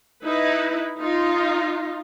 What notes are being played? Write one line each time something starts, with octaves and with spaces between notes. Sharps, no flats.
D#4 E4 B4
D#4 F4